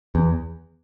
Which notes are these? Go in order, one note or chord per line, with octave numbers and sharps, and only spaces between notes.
E2